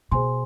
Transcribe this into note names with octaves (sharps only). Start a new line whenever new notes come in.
B2 G#4 C5 G#5 C6